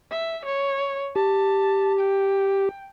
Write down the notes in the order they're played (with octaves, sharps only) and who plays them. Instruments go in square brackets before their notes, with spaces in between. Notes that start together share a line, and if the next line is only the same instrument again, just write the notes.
[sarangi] E5
C#5
[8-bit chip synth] G4 [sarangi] A5
[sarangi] G5